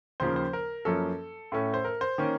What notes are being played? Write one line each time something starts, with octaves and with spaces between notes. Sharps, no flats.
D#2 C#3 F3 A#3 C5
C5
A#4
F#2 F3 A#3 C#4 A4
A2 A3 C#4
C5
A#4
C5
D#3 A#3 C#4